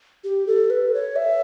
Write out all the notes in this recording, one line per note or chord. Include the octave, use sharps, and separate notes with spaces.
G4
A4
B4
C#5
E5